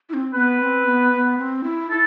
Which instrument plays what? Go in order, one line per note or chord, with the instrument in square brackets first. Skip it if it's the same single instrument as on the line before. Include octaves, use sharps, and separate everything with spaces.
[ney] E4
C4
[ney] B3 [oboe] B4
[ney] C4
B3
B3
C4
E4
[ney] E4 [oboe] A4